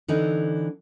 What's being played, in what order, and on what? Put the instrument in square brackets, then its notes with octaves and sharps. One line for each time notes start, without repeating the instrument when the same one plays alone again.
[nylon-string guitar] D3 E3 C4 D#4